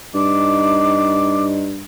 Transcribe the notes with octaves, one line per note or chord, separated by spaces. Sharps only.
G2 D#4 D6